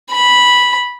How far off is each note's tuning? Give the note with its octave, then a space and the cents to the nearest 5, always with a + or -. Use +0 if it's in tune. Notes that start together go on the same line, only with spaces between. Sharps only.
B5 -10